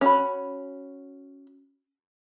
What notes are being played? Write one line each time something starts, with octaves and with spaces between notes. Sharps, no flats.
C#4 F#4 B5